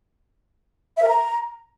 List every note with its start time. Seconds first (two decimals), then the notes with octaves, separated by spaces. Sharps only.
0.97 E5
1.02 A#4
1.08 A#5